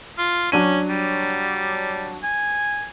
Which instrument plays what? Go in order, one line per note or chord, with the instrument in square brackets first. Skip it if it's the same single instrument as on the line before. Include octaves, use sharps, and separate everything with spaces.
[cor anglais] F4
[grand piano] F#3 D4 D#7 [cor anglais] C#4
[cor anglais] G3
G#5